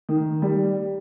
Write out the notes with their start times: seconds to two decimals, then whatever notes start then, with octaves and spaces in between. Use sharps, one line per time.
0.09 D#3
0.42 G3